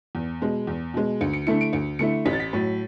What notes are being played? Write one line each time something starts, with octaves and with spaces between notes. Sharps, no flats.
E2
B2 G#3
E2
B2 G#3
D2 C#7
C#7
D3 A3 E4 C#7
D7
D2 C#7
D3 A3 E4 C#7
A1 B6
A6
B6
A2 F#3